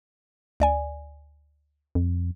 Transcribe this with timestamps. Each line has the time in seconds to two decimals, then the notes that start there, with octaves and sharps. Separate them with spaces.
0.60 D2 D5 G#5
1.95 F2